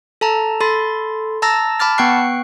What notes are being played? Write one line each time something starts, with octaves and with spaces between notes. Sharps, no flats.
A4 A5 A#5
A4 B5 C6 A6
A5 A#5 E6 A6 A#6
A5 B5 D6 F6 A6
B3 F#5 G5 C#6 F#6 C7